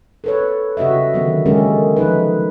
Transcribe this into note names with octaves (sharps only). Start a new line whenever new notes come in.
A4 B4 C#5
C#3 F#4 G4 D#5 E5
D3 D#3 F#3 B3
G#3 A#3 C#4 G4 A4 A#4
F3 A3 D#4 B4